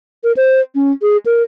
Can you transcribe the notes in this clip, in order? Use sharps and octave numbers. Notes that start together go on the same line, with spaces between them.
A#4
C5
C#4
G#4
A#4